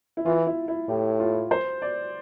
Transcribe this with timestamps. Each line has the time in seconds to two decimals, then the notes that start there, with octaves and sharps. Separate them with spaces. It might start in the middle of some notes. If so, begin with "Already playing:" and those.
0.17 E4
0.26 E3 F4
0.47 E4
0.68 E4
0.89 A2 G4
1.20 F4
1.51 C5
1.82 D5